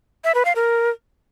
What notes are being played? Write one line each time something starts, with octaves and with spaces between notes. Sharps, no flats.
E5
B4
F5
A#4